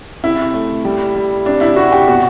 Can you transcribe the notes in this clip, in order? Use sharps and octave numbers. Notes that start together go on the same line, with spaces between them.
C3 E4
A3
G3
G3
C3 D4
E4
C3 F#4
G4
B2 F#4